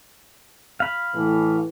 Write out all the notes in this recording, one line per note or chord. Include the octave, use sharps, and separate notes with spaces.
F5 B5
A2 E3